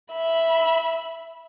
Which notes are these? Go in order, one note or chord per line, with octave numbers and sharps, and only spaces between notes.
E5 B5